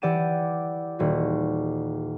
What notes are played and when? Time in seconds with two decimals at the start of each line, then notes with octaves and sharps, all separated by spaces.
0.02 E3 G4 D5 F#5 D#7 E7
0.99 D#1 F#4